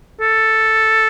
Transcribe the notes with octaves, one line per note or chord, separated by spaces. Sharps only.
A4